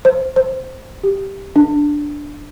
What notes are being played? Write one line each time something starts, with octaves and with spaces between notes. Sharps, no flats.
C5
C5
G4
D4